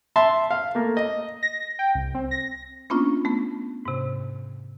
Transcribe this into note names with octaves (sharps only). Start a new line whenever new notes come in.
E5 A5 C6
F5
A3 A#3
D#5
A#6
G5
C2
C4
A#6
A#3 B3 C#4 D4 F4
A3 B3
G#2 C3